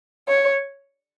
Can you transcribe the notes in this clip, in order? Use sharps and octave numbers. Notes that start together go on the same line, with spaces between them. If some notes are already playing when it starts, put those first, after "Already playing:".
C#5